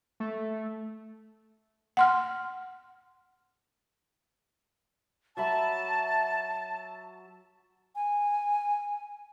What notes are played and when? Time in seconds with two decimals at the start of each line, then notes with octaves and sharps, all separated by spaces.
0.20 A3
1.97 F#5 C6 F6
5.37 F#3 E5 A5 B5
7.96 G#5